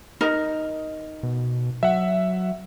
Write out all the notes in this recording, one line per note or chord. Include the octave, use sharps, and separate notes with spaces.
D#4 A#4
B2
F#3 E5 F#5